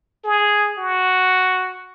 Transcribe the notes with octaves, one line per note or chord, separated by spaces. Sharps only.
G#4
F#4